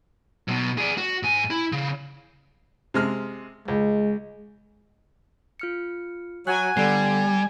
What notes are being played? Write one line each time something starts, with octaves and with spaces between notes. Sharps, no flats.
B1 B2
G#4 D5
F#4
G#2 G#5
E4
C#3
C3 G#3 F6
C#2 G#3
F4 F6 C#7
F#3 F#5 G#5 F#6
D3 G3 B3 D5 C7